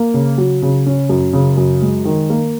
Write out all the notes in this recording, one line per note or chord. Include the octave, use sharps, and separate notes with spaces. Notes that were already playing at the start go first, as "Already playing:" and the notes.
Already playing: A#3
C#3
F#3
C#3
C#4
F#2
C#3
F#2
G#3
D#3
A#3